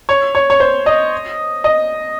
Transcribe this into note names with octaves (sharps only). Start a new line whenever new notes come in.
C#5
C#5
C#5
C5
D#5
D#5